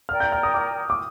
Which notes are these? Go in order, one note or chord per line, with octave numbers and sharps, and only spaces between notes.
A#4 D5 G5 F6
G6
F6
D#6
D6
D6